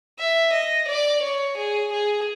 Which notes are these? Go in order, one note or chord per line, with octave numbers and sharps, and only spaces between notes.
E5
D#5
D5
C#5
G#4
G#4